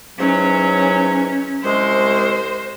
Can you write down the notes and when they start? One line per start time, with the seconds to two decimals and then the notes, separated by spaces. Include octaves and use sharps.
0.18 G#2 E3 F#3 C#4
1.64 C2 G#3 C5